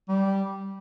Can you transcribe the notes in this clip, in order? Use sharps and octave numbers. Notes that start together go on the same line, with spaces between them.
G3